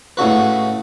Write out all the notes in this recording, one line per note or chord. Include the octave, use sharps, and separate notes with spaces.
A2 C#3 F#4 B4